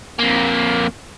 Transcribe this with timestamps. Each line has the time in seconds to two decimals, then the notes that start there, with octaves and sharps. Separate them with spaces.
0.19 F2 A#3